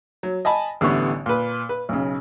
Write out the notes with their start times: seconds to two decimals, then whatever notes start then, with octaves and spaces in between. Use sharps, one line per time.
0.23 F#3
0.45 D#5 G#5 A5 B5
0.81 A1 D3 E3 G3 B3 C#6
1.26 A#2 B4
1.69 B4
1.89 B1 C#3